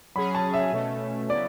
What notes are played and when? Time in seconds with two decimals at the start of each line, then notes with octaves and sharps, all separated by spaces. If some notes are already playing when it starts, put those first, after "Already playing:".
0.16 F#3 C#4 G#4 B5
0.35 A5
0.54 E5
0.73 B2 A3 C#4
1.30 C#3 F#3 B3 E4 D5